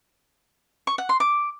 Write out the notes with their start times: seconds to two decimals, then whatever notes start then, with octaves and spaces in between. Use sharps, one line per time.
0.87 C#6
0.98 F#5
1.09 C6
1.20 D6